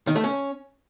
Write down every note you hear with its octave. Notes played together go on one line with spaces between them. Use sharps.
D#3
A3
C#4